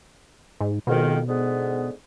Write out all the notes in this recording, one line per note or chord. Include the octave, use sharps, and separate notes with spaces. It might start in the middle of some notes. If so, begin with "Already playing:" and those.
G#2
F2 G#2 B2 D#3
G#2 D3 B3